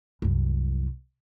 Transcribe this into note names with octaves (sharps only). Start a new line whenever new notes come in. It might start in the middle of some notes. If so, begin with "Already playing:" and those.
C2 F#2